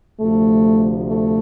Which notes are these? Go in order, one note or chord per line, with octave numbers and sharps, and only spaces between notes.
D2 C3 F3 A3
A3